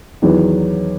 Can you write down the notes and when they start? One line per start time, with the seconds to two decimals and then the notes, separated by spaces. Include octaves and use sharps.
0.22 E2 D#3 F#3 B3